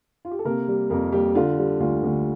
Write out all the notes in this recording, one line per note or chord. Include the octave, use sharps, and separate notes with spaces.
F4
G4
A4
C3 A#3 A#4
G3
F2 A#3 A#4
G3 A#3 G4
D3 F4
G3
D2 F4
D2